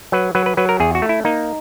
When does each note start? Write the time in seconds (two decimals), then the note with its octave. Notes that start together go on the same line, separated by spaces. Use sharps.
0.12 F#3 B4
0.35 F#3 B4
0.46 B4
0.57 F#3 B4
0.69 A#4
0.80 E2 G#4
0.95 F#4
1.02 A3
1.09 E4
1.25 A#3 D#4